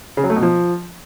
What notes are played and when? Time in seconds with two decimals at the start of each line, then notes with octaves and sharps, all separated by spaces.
0.17 C#3
0.24 F#3
0.30 A3
0.36 B2
0.42 F3